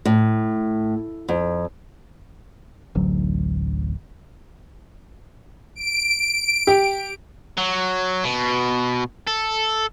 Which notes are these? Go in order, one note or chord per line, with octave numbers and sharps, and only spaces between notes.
A2
F2
D1 A1 D2 F#3
D7
G4
F#3
B2
A4